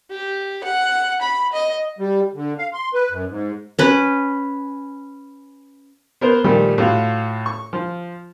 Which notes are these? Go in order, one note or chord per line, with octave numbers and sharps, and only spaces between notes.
G4
F#5
B5
D#5
G3
D3
F5
C6
B4
F#2
G#2
C#4 B4
B3 A#4 C5
A#2 D#3 F3 G3 A3
A2 F4 F#4
C#6
F3